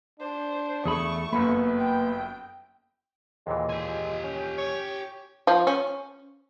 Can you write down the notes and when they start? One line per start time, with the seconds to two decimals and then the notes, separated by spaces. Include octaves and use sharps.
0.20 D4 C5
0.86 E2 A3 G#4 B5 C#6 D#6
1.32 G1 F#2 A#3 B3 B5
1.79 G5
3.47 D#2 A#2 E3 G#3
3.70 G4 G#5
4.24 C#4
4.58 C#5
5.47 F3
5.67 C#4